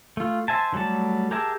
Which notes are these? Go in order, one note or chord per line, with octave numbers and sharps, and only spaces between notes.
A3 F4
C5 E5 G#5 A5
D#3 F#3 G3 A3 A5
G4 G#4 A#4 E5 A5